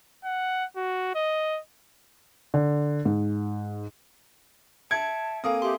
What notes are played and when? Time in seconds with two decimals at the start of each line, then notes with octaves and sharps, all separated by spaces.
0.24 F#5
0.76 F#4
1.15 D#5
2.54 D3
3.05 G#2
4.91 E5 A5 G#6 C#7 D7
5.44 A#3 C4 A4 G#5 D#6
5.62 G4 E5 C6